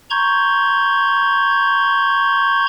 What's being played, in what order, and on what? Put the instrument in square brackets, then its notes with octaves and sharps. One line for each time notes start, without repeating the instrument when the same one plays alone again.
[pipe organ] A#5 C6 C#6 G6 G#6